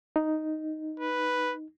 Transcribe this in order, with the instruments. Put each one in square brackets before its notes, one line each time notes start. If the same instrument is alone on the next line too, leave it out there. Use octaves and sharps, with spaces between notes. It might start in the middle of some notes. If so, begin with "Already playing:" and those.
[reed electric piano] D#4
[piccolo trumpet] B4